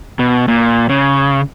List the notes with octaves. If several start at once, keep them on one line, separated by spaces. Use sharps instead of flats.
B2
A#2
C#3